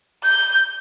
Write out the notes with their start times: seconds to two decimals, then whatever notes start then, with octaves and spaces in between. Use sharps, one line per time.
0.23 G6